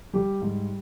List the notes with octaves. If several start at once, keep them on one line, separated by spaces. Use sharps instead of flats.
G3 G4
G#2